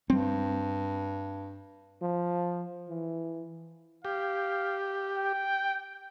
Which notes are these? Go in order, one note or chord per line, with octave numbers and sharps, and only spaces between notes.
G2 G3 C4
F3
E3
G4 F5
G5